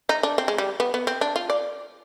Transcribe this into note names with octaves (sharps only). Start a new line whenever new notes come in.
D#4
D4
C4
G#3
G3
B3
B3
C4
D4
F4
D5